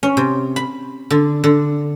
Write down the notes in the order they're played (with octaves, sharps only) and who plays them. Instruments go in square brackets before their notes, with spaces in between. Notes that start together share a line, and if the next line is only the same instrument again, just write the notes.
[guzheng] C#4
C3
B5
D3
D3